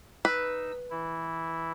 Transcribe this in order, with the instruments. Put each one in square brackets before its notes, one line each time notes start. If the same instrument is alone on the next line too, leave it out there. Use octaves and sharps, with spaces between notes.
[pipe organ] D#4 E6 [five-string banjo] B4
[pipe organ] E3 E4